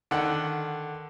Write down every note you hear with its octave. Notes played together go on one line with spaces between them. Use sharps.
D3 D#3 F#5